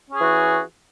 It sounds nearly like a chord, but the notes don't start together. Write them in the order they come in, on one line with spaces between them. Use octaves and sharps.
C#4 G#4 E3 F#4